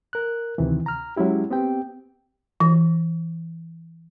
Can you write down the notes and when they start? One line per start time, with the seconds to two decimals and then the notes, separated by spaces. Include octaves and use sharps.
0.13 A#4 F#6
0.58 D2 C3 D#3 E3
0.86 A#5 F6
1.16 F#3 G#3 C#4 E4 G4
1.50 B3 C4 G4 G5
2.60 E3